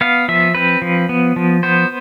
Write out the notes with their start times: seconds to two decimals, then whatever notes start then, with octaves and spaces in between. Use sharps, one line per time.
0.01 B3 F5
0.28 F3 E5
0.55 C4 B4
0.82 F3
1.09 B3
1.36 F3
1.63 B3 C5